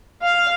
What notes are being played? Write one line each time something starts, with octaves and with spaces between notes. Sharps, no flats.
F5